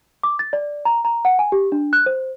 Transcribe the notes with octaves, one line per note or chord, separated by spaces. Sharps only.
D6
A6
D5
A#5
A#5
F#5
G#5
G4
D4
F#6
C5